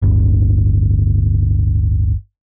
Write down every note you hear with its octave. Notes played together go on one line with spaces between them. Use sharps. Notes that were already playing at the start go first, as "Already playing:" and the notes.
D1 G1